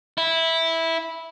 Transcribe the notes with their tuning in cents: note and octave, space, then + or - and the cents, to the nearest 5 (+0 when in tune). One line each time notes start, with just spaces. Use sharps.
E4 -10